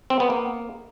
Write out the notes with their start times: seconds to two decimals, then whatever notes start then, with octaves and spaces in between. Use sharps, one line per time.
0.10 C4
0.20 B3
0.30 A#3